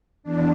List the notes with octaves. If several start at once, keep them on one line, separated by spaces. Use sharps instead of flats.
E2 D4